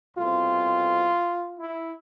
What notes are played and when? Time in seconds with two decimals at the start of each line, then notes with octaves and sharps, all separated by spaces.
0.16 C2 B2 A3 C4 F4
1.58 E4